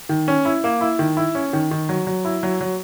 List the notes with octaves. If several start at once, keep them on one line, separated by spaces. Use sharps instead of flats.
D#3
C#4
E4
A#3
E4
D#3
E4
C#4
D#3
D#3
F#3
F#3
E4
F#3
F#3